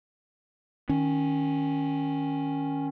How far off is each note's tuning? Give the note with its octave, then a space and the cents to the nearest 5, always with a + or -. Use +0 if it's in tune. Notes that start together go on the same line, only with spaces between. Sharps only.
D#3 +0 C#4 +0